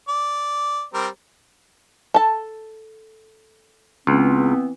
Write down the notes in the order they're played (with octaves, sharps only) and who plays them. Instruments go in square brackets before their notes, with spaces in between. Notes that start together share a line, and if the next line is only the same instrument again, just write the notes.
[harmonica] D5
G3 C4 A#4
[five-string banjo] A4 A5
[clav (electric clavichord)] C#2 [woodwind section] E3 B3 C4